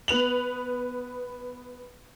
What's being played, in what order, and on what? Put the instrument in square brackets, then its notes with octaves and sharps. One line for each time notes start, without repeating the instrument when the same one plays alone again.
[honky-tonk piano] B3 B4 F7 F#7